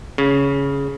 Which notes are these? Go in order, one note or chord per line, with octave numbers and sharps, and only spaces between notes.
C#3